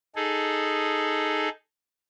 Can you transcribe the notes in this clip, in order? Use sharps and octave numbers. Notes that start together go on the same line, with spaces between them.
D#4 G#4 A4